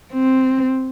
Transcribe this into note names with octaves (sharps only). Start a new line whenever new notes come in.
C4